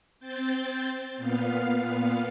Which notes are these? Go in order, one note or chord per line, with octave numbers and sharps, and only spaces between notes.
C4 G6 A6
A#2 B3 F5